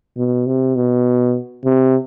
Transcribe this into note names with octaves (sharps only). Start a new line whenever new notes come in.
B2
C3
B2
C3